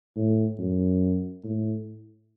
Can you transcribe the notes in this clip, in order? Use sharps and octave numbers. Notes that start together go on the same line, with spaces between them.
A2
F#2
A2